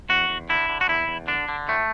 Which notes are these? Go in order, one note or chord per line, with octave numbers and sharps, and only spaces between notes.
E2 F#4
E2
D3 E4
D3
F#4
E2 E4
E2
D3 D4
D3
A2 A3